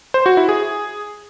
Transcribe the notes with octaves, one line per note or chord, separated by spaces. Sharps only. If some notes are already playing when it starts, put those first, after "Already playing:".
C5
F#4
E4
G#4